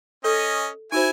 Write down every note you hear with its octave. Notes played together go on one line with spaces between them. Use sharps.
C#4 A4 D#5
D#4 E4 F#4 C5 G#5